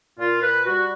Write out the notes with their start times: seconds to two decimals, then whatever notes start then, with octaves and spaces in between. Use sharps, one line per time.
0.19 A#2 F4
0.42 B4
0.66 G3 F#4